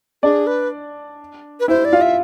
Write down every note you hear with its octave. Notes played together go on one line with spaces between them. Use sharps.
D4 G#4 D5
B4
B4
E4 C5 E5
D5
F4 F5
E5